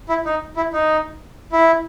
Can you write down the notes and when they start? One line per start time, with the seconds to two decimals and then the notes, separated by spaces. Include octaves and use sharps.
0.09 E4
0.25 D#4
0.56 E4
0.73 D#4
1.52 E4